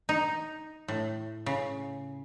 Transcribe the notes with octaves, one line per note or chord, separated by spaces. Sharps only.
D#4
A2
C#3